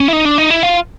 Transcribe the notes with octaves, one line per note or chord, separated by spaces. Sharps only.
C#4
E4
D#4
D4
D#4
E4
F4